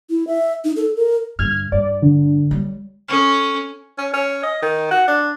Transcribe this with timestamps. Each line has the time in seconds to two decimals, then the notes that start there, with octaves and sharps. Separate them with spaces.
0.10 E4
0.27 E5
0.65 D#4
0.76 A4
0.96 A#4
1.39 G2 D3 F6 G#6
1.72 G2 D5
2.02 D3
2.51 F#3 G3
3.09 C#4 A4 C#6 F6
3.98 C#4
4.14 C#4
4.43 D#5
4.62 D#3
4.91 F#4
5.08 D4